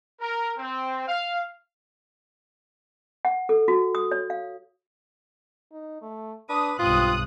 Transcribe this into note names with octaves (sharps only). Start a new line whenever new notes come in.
A#4
C4
F5
F#5
A4
F#4
D#6
C#5
F5
D#4
A3
D4 B4 D#6
B1 G2 C4 F4 D#6 F#6